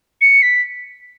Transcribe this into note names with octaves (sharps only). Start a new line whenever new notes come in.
C#7
B6